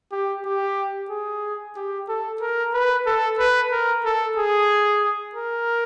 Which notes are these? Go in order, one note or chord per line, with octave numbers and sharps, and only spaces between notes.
G4
G4
G#4
G4
A4
A#4
B4
A4
B4
A#4
A4
G#4
A#4